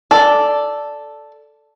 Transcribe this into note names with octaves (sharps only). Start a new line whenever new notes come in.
A4 D5